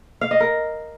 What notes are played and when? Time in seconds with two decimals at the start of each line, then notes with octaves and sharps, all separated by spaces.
0.21 F5
0.31 D#5
0.40 A#4